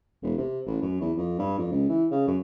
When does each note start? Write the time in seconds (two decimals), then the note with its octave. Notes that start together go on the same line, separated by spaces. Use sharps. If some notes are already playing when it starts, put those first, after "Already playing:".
0.23 E1
0.38 C3
0.66 A1
0.82 F#2
1.01 E2
1.17 F2
1.39 G2
1.58 F2
1.71 C#2
1.89 E3
2.11 C#3
2.27 F#2